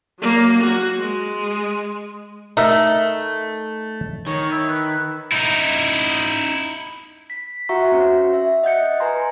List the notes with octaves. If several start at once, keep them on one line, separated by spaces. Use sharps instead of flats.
F#3 A#3
F#4
G#3
A3 D#4 A#4 E5
D#3 C#5
E4
B4
D#4 E4
B6
F#4 E5 F#5 A#5 C#6
C4 C#4 F#4
E5
D#5 F#5 G6 C#7
B4 G#5 A#5 C6